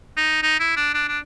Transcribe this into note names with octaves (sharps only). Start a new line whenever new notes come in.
D#4
D#4
E4
D4
D4
D4